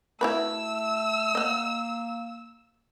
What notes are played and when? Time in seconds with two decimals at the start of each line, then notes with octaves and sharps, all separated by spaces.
0.21 A3 E4 F#4 B4 E6
1.35 A#3 D#5 F#5